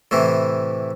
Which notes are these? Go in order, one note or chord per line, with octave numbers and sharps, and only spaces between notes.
A2 C3 E3